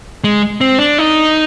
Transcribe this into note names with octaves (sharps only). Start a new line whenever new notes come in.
G#3
C4
D4
D#4